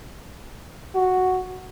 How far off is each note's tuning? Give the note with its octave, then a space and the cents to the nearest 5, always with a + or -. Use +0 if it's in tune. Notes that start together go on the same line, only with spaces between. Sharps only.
F#4 +0